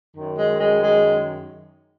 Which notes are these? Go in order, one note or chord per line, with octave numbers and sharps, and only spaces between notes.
F#2 D#3
G#3
G#3
G#3